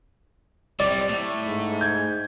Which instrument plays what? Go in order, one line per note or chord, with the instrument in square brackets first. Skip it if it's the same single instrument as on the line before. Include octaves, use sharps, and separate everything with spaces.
[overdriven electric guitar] G3 C4 [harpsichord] D5
[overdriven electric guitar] A2
[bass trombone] G#2
[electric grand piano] G6 G#6